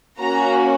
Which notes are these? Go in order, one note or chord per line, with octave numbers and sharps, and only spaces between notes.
A#3 C#4 F#4 A#5